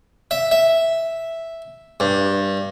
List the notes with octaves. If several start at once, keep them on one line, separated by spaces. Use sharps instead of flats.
E5
E5
G2